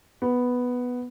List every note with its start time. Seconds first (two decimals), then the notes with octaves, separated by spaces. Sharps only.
0.22 B3